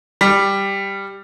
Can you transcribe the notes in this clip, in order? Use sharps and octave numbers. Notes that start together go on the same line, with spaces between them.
G3